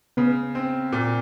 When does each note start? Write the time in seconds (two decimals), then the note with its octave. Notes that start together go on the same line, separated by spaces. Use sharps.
0.17 C#3 B3
0.55 C4
0.92 A#2